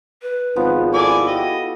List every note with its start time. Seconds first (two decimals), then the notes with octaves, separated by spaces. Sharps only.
0.22 B4
0.56 G#1 F3 B3
0.94 E4 A4 D5 D#5 G#5
1.27 A3 F#4 G4 D#5